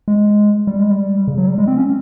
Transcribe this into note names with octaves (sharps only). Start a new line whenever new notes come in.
G#3
G3
G#3
G3
C#3
F#3
G3
G#3
C4
C#4